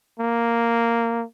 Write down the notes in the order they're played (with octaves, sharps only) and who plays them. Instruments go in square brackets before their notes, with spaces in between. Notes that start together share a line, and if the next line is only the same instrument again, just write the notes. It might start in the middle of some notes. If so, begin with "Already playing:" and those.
[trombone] A#3